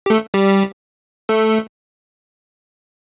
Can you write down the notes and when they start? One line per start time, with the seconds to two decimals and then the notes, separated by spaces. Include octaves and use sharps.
0.06 G4
0.10 A3 A4
0.34 G3 G4
1.29 A3 A4